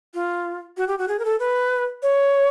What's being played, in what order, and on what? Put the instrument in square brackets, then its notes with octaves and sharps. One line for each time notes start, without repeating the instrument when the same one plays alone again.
[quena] F4
F#4
G4
F#4
G#4
A#4
A4
B4
C#5